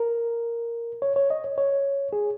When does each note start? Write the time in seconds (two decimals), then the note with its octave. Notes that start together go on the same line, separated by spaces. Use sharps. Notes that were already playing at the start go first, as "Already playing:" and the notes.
Already playing: A#4
1.02 C#5
1.16 C#5
1.30 D#5
1.44 C#5
1.58 C#5
2.13 G#4